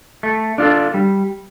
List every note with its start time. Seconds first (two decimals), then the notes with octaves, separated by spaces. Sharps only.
0.23 A3
0.58 D4 F4 A4
0.94 G3